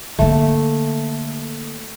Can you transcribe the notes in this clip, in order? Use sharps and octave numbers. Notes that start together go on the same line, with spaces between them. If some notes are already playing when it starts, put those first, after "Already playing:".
D3 A3 A#3